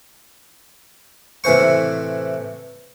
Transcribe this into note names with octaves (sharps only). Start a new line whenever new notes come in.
A2 C3 E3 C5 C#6